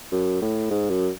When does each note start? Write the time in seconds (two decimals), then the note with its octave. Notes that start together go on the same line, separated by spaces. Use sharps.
0.12 F#2
0.42 A2
0.71 G#2
0.90 F#2